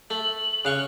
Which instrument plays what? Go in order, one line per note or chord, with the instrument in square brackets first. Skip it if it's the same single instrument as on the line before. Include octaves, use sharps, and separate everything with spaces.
[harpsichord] A3 [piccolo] F#7
[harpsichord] C#3 F5 C#6 [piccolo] F#6